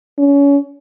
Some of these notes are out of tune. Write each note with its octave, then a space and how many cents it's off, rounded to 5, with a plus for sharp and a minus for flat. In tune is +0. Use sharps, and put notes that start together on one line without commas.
C#4 +30